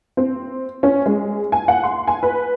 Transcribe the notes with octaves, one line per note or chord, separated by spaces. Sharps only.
C4
C#4
G#3
G#5
F#5
C6
G#5
B4